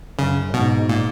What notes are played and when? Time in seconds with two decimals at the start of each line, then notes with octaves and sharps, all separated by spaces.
0.19 F#2 C#3
0.54 G#2 B2
0.89 A#2